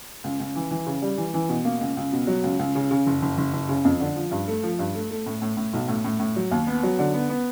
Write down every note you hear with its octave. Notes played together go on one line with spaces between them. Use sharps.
C#2
C#2
E3
E3
C#3
G3
E3
E3
B2
A#3
C#2
C#2
B2
F#3
C#2
C#2
C#3
C#3
F#1
F#1
F#1
F#1
C#3
F2
D3
F3
G2
A3
F3
G2
A3
A3
A2
A2
A2
B1
A2
A2
A2
F#3
D#2
B3
F#3
D3
B3
B3